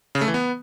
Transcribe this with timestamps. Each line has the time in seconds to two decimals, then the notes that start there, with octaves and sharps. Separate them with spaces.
0.15 C#3
0.21 A3
0.28 E3
0.34 B3